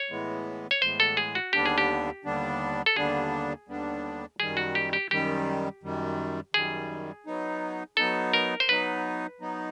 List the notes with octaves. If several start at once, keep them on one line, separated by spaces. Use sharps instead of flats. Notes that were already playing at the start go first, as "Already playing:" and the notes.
Already playing: C#5
A2 E3 G#3 B3
C#5
A2 E3 G#3 B3 C5
A4
G#4
F#4
D#2 D3 G3 B3 D4 G4
G#4
G4
D#2 D3 G3 B3 D4
A4
D#2 D3 G3 B3 D4 G#4
D#2 D3 G3 B3 D4
F#2 D#3 G3 G#4
F#4
G4
G4
F#2 D#3 G3 G4
F#2 D#3 G3
F#2 D#3 G3 G#4
F#3 B3 D#4
F#3 B3 D#4 A4
A#4
C5
F#3 B3 D#4 B4
F#3 B3 D#4